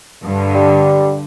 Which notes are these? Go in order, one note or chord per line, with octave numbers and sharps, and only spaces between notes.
G2 D3
G3